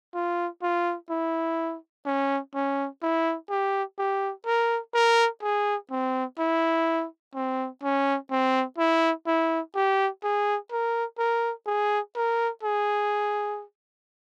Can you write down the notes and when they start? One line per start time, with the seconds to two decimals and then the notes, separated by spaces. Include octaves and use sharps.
0.14 F4
0.62 F4
1.10 E4
2.06 C#4
2.54 C#4
3.02 E4
3.50 G4
3.98 G4
4.46 A#4
4.94 A#4
5.42 G#4
5.91 C4
6.38 E4
7.34 C4
7.83 C#4
8.31 C4
8.78 E4
9.26 E4
9.75 G4
10.23 G#4
10.71 A#4
11.18 A#4
11.66 G#4
12.16 A#4
12.63 G#4